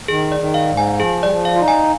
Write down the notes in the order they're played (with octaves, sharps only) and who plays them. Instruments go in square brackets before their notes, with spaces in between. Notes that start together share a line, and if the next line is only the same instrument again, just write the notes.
[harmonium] D#3 [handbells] G#4
[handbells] D5
[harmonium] D#3
[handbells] F5
[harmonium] G#2
[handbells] G#5
[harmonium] F3 [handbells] G#4
[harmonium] G3 [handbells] D5
[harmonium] F3
[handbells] F5
[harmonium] F4
D#4
[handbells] G#5